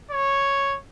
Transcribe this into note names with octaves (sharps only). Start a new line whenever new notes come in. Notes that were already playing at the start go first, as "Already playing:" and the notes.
C#5